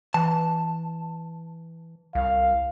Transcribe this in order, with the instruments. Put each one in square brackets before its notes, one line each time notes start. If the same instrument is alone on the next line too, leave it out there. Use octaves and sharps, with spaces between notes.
[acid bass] E3 [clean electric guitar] A5
[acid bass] C2 [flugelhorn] F5